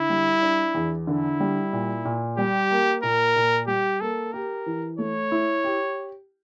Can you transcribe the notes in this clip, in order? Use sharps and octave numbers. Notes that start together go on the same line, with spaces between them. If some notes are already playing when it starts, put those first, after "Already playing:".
Already playing: D3 E4
G3
D4
E2
D3 E4
G3
A#2
A#2
G3 G4
A#3
A#2 A#4
A#2
G3 G4
A#3 A4
G4 A#4
E3
A3 C#5
E4
G4